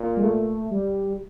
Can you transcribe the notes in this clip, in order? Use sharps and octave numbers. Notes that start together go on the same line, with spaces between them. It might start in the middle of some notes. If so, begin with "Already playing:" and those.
Already playing: A#2
G#3
A3
G3